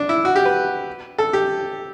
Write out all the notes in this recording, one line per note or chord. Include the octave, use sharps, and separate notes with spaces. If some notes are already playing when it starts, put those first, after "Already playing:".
Already playing: D4
E4
F#4
G4
B4
A4
G4